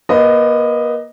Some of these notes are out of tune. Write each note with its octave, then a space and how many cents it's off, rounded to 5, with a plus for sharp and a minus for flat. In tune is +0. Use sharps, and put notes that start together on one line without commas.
A#3 +40 B4 +20 D#5 +0